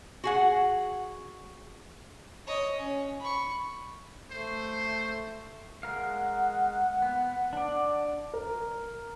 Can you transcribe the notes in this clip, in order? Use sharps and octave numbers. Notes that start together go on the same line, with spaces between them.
F#4 G#4 F#5
C#5 D#5
C#4
B5 C#6
A3 C5
G#3 A#4 F5 F#5
B3
D4 D5
A#4